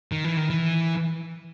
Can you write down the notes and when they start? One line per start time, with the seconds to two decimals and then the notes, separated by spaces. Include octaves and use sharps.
0.12 D#3
0.24 E3
0.37 D#3
0.50 E3